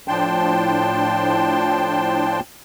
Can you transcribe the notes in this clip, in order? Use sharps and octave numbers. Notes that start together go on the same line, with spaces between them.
A2 F3 D4 G5 A5 C6